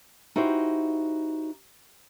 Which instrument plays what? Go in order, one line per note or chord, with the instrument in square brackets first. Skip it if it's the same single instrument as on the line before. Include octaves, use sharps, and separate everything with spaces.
[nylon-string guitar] D#4 E4 F#4 G4 C5